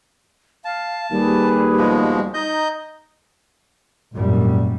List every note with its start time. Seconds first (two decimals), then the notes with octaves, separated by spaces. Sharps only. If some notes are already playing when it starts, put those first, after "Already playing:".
0.65 F5 A5
1.11 D#2 G3 G#4 B4
1.77 B2 F3 G#3
2.34 D#4 D#5 G6
4.15 G#1 F#2 A#2 G3